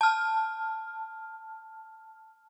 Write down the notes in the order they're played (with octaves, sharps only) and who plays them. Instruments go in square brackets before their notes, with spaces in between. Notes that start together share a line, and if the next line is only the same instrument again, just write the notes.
[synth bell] A5 F6